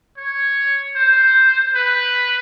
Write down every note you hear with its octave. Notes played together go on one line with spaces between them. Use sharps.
C#5
C5
B4